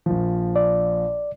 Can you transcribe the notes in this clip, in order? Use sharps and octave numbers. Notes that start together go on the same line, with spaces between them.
A#1 F3
D5